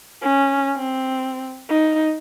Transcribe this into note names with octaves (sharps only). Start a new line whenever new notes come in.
C#4
C4
D#4